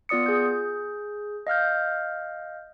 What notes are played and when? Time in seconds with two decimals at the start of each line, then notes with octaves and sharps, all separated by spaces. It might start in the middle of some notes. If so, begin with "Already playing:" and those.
0.09 B3 F4 D5 D#6 C#7
0.26 G#4 G6
1.47 D#5 F5 F6 G6